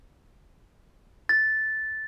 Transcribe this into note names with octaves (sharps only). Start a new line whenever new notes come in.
A6